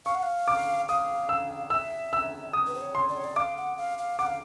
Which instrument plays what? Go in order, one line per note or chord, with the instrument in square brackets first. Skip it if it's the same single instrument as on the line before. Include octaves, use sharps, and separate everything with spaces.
[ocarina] F5 [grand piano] C#6
[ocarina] F#5
F5
[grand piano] D6
[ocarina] F5 [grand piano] D#6
[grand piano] E6
[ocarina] E5 [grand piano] E6
[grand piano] E6
D#6
[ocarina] B4
C5
C#5
[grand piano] C6
[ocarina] D5
C#5
D5
[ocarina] F5 [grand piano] D6
[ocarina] F#5
F5
F5
[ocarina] F#5 [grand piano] D6
[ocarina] F5